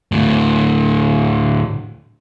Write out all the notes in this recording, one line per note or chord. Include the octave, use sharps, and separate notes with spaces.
D2 A2